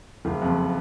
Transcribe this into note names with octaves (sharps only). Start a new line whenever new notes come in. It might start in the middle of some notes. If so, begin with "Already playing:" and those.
F#1
F2